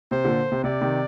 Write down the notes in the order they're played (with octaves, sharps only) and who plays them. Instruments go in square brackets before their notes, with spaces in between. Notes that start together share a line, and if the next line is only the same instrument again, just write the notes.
[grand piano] C3 [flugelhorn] C5
[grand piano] A#2 D3
C3
[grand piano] C3 [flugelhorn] D5
[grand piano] C3 D#3